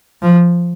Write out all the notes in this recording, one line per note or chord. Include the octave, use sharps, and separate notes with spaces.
F3